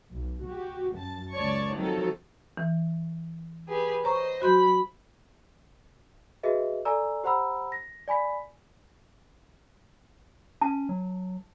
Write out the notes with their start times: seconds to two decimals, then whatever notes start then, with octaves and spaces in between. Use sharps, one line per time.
0.11 B1
0.46 F#4 G4
0.94 F#2 A5
1.34 C#2 C#5 D5 A5 C#6
1.75 D#3 F3 F#3 C4 D#4 A4
2.57 E3
3.67 G4 G#4 B4
4.04 C5 C#5 D#5 A#5 C#6
4.42 F#3 F#4 B5 C6 G6
6.43 F#4 G#4 B4 D#5 E5
6.85 A4 D5 G#5 A#5 E6
7.24 G4 C5 F#5 A#5 B5 E6
7.72 A#6
8.08 D5 G#5 B5 B6
10.61 C#4 A5
10.89 F#3